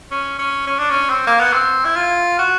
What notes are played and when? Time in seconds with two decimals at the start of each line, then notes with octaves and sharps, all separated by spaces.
0.11 C#4
0.39 C#4
0.67 C#4
0.79 D4
0.90 C#4
1.09 C4
1.27 A#3
1.40 B3
1.53 C4
1.84 E4
1.96 F4
2.39 F#4